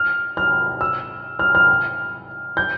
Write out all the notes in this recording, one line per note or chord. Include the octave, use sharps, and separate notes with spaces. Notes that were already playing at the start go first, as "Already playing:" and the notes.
Already playing: F6
F6
E6
F6
F6
G6